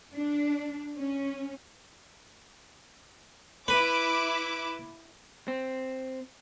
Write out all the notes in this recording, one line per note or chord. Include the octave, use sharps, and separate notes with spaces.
D4
C#4
E4 B4 D6
C4